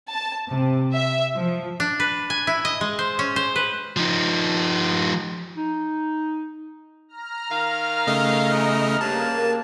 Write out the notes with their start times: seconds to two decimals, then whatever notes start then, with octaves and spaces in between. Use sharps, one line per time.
0.10 A5
0.49 C3
0.92 E5
1.35 F3
1.80 D4
2.00 B4
2.30 G#5
2.47 E4
2.65 D#5
2.81 G#3
2.99 C5
3.19 C#4
3.36 C5
3.56 B4
3.97 F3 D#4
5.57 D#4
7.08 A#5 F6
7.51 D#3 F5
8.07 C#3 A3 D#5
8.52 G#2 B2 E3
9.01 G2 C#3 A#3 A5